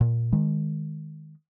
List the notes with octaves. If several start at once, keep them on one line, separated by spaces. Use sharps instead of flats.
A#2
D#3 G#3